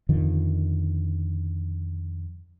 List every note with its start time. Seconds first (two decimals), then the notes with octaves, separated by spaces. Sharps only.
0.09 F2 D3 D#3 F3